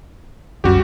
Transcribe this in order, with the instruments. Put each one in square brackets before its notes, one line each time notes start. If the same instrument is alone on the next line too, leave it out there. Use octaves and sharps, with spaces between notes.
[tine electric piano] G1 C2 F#2 [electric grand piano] G3 F#4 G4